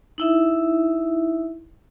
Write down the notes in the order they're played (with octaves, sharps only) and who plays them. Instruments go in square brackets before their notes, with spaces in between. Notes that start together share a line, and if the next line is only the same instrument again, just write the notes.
[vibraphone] D#4 E4 E5